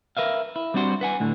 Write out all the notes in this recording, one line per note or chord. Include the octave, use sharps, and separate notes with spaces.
A#4 B4 E5 F5
E4
G3 C4 D4 F#4 C5
B4 F#5 G#5
D2 A2 D3